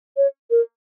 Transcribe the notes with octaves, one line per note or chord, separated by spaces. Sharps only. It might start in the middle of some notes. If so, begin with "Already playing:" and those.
C#5
A#4